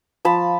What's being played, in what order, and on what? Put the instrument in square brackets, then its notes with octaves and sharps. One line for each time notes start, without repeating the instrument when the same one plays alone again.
[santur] F3 A5 B5